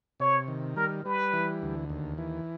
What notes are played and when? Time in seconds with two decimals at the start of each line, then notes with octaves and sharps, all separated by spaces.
0.20 C3 C#5
0.48 D#3
0.76 G3 A#4
1.05 G3 B4
1.33 E3
1.62 D2
1.90 D#2
2.18 E3